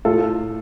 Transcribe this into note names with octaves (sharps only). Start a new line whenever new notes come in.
A2 F4 A4